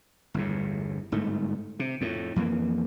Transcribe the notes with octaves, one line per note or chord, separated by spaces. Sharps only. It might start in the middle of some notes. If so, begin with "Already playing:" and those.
G1 E2 A2
G1 G#2 A3
C3
F2 A2
F2 E3 A#3